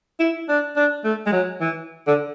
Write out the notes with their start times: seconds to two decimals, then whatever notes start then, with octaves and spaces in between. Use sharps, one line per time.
0.20 E4
0.49 D4
0.77 D4
1.04 A3
1.27 G#3
1.32 F#3
1.61 E3
2.08 D3